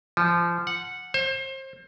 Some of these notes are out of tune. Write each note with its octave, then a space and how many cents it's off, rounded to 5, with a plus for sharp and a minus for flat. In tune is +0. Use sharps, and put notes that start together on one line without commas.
F3 -25
F#5 -10
C5 +30